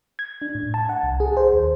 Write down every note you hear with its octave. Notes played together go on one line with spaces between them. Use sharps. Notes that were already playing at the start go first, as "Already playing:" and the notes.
G#6
D4
A2
A5
F#5
C2
G#4
C5
D#2